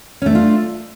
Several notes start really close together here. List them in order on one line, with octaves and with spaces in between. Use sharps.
C#4 A3 D4 F4